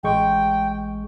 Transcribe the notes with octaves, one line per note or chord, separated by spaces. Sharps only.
A1 G#3 G5 C#6